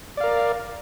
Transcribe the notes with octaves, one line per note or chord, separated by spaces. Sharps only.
A#4 D5 F5